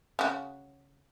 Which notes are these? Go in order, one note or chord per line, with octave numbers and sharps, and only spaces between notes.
C#3 F#4